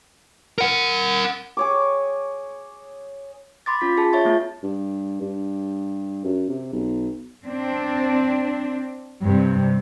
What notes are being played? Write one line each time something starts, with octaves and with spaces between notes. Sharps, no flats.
A#4 F#5
G#4 C#5 D6
B5 C6 D6 A6
C#4 F4 B6
F4 G#4 A5
C#5 E5 C#6 A6
A3 B3 F4 A6
G2
G2
F#2
C3
B1
C4 D4
G2 C3